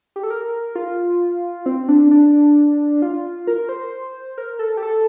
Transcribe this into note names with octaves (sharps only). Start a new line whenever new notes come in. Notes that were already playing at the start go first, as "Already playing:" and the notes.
G4
A4
A#4
F4
C4
D4
D4
F4
A#4
C5
A#4
A4
G4
A4